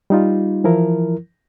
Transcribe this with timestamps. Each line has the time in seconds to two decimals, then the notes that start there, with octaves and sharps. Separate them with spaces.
0.10 G3 D#4 F4
0.64 E3 F3 E4 A#4